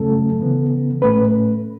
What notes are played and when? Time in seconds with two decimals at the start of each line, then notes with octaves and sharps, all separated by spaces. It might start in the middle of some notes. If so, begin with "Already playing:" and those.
Already playing: F#2 C#3 F#3 A3 C#4 A4
0.40 C#3 E3 B3
1.01 A2 A3 C#4 B4